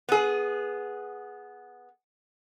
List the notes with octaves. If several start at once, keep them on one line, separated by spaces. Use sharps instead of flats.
B3 G#4